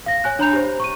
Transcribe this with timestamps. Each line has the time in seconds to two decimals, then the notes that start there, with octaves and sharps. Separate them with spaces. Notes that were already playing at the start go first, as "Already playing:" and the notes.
0.06 F5 A#6
0.24 C#5 G#5 F#6
0.39 D4 C#5 A#5 B5 G6 F7
0.53 G4 C5
0.80 C#6 D#7